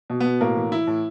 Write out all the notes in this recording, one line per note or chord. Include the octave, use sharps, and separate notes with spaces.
B2
B2 B3
A2 A#3
E3
E3 E4
A2